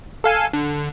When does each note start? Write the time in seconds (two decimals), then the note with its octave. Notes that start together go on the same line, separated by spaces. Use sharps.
0.24 A4 F5 G#5
0.53 D3